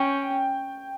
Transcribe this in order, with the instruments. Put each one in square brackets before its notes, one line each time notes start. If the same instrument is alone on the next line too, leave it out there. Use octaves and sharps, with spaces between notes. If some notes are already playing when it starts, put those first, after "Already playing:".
Already playing: [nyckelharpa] C#4 [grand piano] G5